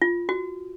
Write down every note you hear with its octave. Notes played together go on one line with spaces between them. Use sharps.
F4
F#4